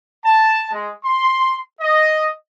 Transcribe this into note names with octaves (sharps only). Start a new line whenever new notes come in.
A5
G#3
C6
D#5